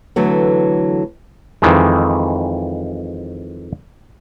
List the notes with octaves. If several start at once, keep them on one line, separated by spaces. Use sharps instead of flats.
D3 E3 F#3 A3 B3
F2 D#3 E3 G#3